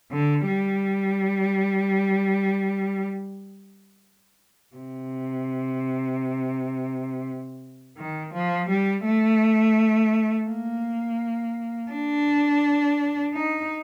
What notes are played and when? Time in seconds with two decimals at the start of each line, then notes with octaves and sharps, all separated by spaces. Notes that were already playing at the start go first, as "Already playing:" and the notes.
0.11 D3
0.46 G3
4.76 C3
7.97 D#3
8.34 F3
8.69 G3
9.05 A3
10.48 A#3
11.91 D4
13.34 D#4